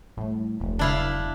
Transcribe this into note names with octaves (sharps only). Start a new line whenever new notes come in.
A2 G3 A3
E1 F3 A3
C#3 F#3 D4 E4 F5